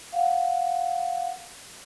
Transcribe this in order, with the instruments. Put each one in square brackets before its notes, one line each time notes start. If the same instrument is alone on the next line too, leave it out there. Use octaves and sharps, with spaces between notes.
[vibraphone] F5 F#5